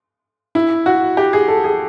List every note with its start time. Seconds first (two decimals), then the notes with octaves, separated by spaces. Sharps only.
0.55 E4
0.86 F#4
1.17 G4
1.33 G#4
1.48 A4
1.64 G#4